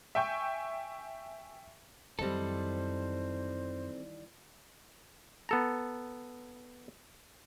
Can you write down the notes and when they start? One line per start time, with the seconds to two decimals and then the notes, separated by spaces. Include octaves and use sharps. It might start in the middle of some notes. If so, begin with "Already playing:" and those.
0.15 E5 G5 G#5 C#6 G6
2.19 F#2 D#3 E3 G3 C4 A4 C5
5.49 B3 A4 A#5